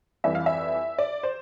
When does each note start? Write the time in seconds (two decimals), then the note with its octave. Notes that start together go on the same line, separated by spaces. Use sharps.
0.24 F2 E3 G3 E5
0.35 F5
0.46 E5
0.99 D5
1.23 C5